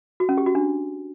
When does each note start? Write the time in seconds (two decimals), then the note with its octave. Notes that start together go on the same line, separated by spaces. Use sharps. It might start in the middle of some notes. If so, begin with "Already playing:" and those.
0.20 F#4
0.29 C#4
0.37 G4
0.46 F#4
0.55 D4